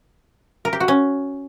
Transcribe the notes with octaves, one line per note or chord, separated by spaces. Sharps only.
A#4
G4
F#4
C#4